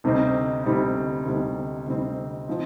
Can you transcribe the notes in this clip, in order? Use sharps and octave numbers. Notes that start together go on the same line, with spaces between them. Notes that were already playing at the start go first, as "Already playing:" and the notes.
D2 C3 G3 C4 D#4
D2 C3 G3 C4 D#4
D2 C3 G3 C4 D#4
D2 C3 G3 C4 D#4
F3 C4 D#4